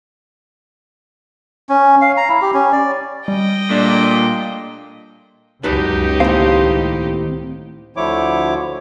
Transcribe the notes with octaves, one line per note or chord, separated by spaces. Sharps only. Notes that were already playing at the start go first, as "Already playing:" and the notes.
C#4
F5
A#5
E4
G4
C#4
D5
G3 D#5 G5
A#2 G3 A3 D4
C#2 F#2 D#4 G4 B4 A5
D#2 A2 C4 C5 F5
D2 D3 F3 E4 C#5 D6